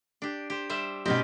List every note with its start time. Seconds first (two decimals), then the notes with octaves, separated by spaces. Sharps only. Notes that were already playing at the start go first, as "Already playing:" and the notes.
0.22 D4 G4
0.50 G4 C5
0.70 G3 C5 E5
1.05 B2 C4 C#4 D#4 G4